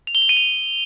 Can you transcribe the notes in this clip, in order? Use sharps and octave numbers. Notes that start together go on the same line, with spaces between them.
F7
G7
F7
D#7
F7